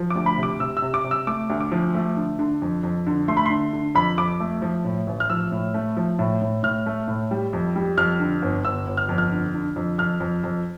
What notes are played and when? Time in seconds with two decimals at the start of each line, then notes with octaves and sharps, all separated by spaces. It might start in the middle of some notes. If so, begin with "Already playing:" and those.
Already playing: F3
0.10 D6
0.16 D2
0.26 B5
0.37 C3
0.43 D6
0.60 C3 E6
0.77 E6
0.82 C3
0.94 D6
1.04 C3
1.11 E6
1.27 A3 D6
1.50 D2
1.61 D6
1.72 F3
1.95 A3
2.17 D3
2.39 D3
2.62 F2
2.83 F2
3.07 D3
3.28 A3 C6
3.37 B5
3.46 D3 C6
3.73 D3
3.95 F2 B5
4.18 F2 D6
4.40 A3
4.62 F3
4.85 A2
5.07 A1
5.20 F6
5.30 F3 E6
5.52 A2
5.74 A3
5.97 F3
6.19 A2
6.42 A2
6.63 A2 F6
6.86 A3
7.08 A2
7.31 G3
7.53 F2
7.76 G3
7.97 F2 F6
8.20 D3
8.42 G1
8.64 G1 E6
8.87 G1
8.97 F6
9.09 F2
9.18 F6
9.32 D3
9.54 D3
9.76 F2
9.98 F2 F6
10.20 F2
10.44 F2